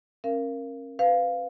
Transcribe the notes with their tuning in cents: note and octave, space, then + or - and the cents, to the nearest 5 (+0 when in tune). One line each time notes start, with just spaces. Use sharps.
C#4 -35 A#4 +0 F5 -30
B4 +30 F5 +0